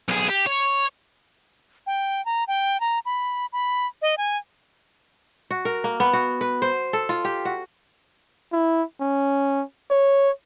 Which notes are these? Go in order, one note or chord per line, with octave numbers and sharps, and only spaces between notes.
B1 G#4
G4
C#5
G5
A#5
G5
A#5
B5
B5
D#5
G#5
F#4
A#4
A#3
B3
F#4
B4
C5
A4
F4
G4
F#4
E4
C#4
C#5